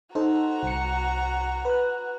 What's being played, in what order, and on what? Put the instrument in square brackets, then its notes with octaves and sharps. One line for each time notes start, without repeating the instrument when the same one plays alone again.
[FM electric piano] D#4 A4 C5 [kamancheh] F#4 A#5
[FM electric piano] C2 C#7
B4 F#6